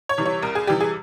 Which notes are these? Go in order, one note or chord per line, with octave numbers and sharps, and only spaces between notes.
C#5
C3 E3 G3
C#5
C2 A#4
G#4
C3 E3 G3 G4
G#4